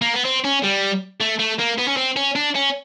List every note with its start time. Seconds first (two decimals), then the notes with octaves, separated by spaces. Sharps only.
0.02 A#3
0.14 B3
0.25 C4
0.45 C#4
0.64 G3
1.21 A3
1.39 A3
1.59 A#3
1.78 B3
1.88 C#4
1.97 C4
2.17 C#4
2.36 D4
2.55 C#4